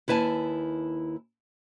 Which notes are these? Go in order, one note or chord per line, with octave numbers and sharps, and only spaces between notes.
D#2 E4 B4 G#5 A5